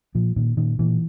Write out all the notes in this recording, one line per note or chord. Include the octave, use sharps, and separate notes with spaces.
A#2 F3
A#2 D#3
A#2 D#3
A#2 E3